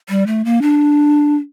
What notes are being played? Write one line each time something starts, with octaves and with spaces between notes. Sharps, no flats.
G3
A3
A#3
D4